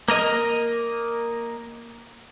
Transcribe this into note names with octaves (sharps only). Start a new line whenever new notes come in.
A#3 A#4 D#5